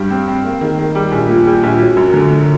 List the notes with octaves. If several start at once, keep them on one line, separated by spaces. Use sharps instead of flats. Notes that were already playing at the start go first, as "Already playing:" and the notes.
Already playing: G2 G3
C4
C4
A#3
D#3
D#3
G3
A#1
A#2
G3
A#1
F#3
F#2
D3
D3